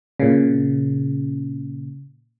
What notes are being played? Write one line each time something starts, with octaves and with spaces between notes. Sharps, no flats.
A#2 C#3